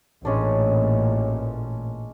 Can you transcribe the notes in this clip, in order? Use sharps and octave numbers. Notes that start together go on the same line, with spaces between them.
A1 A#2 G#3 C#4 D4